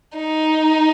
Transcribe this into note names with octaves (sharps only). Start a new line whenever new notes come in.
D#4